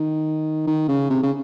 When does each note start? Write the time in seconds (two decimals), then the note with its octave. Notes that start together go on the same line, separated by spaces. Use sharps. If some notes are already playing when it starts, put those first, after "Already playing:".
Already playing: D#3
0.67 D#3
0.88 C#3
1.10 C3
1.23 C#3